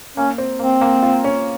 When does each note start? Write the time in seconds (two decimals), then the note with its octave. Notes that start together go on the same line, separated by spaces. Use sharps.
0.17 A#3 C#4
0.38 C4
0.59 A#3 C4
0.81 A#3
1.02 F4
1.24 C#4